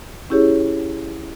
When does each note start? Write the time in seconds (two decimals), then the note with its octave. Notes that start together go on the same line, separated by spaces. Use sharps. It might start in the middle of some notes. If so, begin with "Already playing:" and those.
0.30 C#4 E4 G4 G#4 C#5